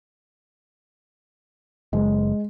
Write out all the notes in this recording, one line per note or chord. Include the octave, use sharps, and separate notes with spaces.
F#1 G#3